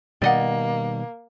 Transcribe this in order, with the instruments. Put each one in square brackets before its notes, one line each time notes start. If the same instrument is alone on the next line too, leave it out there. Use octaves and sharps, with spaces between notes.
[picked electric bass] B2 D#3 G3 [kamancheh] A#3 [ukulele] D5 D#5 F#5